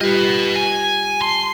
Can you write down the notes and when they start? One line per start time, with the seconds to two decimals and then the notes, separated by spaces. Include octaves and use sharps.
0.01 G3 F4 G4 B4 D#5
0.56 G#5
1.22 A5 C6